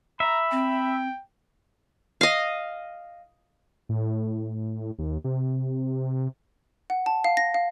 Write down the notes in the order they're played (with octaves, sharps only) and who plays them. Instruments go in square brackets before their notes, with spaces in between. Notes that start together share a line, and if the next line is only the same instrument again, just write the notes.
[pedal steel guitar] E5 [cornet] A#5 [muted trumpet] B5
[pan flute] C4 [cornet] G5
[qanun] D#5 F5
[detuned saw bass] A2
D#2
C3
[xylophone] F#5
A5
F5
A#6
F5